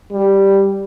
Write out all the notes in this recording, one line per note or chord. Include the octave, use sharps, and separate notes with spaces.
G3